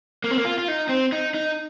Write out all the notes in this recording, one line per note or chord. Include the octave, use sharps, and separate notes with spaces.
A#3
C4
A#3
F4
F4
D#4
C4
D#4
D#4